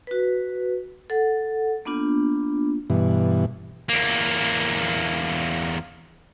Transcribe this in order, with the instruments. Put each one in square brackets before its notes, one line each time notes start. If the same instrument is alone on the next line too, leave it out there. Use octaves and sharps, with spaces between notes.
[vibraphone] F#4 B4
A4 F#5
A#3 B3 D4 F4
[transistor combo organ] G2 B2 E3
[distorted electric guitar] E2 A#3